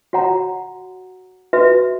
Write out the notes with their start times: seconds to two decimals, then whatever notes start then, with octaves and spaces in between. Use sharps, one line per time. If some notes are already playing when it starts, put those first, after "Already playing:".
0.13 F#4 C#5 F#5 A#5
1.53 F#4 B4 E5